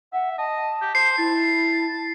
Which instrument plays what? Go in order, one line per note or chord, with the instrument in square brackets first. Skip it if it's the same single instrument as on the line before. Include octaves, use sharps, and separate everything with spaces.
[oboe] E5 [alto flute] F#5
[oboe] D#5 [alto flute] A5
[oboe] G4
[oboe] C5 [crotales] C7
[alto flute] E4 [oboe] A5